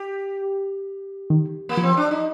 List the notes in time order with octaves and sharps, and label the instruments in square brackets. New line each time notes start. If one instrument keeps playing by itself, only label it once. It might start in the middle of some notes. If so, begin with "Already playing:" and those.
Already playing: [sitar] G4
[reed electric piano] D#3
[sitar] A#3
[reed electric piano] F3
[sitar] C4
D4
D#4